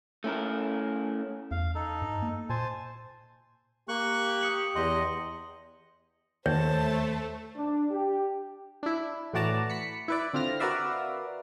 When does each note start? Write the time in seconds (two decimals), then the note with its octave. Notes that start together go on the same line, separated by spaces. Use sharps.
0.24 A3 C#4 E4 A#4
1.51 E2 F5
1.75 D#4 A4
2.02 G2
2.22 A#3
2.50 A#2 C5 G#5 A5
3.89 A#3 G4 C#6 F#6
4.41 D#6 C#7 F#7
4.76 E2 D#5 C6
6.46 D#2 A3 C5 C#5 A5
7.57 D4
7.92 G4
8.83 D4 E4
9.33 A2 E3 F#4 D5 A5 A#5
9.70 B5 B6 C#7
10.08 E4 B4 D5
10.33 D3 C4 F4 F6 A#6
10.60 F#4 A#4 B4 D5 E5 F5